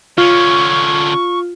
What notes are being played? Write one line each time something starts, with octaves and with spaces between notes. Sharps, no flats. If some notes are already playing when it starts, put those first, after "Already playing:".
D3 C#4 F4 C#6